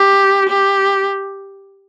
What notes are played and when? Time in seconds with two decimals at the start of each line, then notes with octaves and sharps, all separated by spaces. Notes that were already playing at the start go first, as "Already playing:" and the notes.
Already playing: G4
0.49 G4